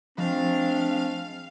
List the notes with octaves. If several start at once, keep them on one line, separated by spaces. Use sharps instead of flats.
F3 G#3 A3 C4 D4 F5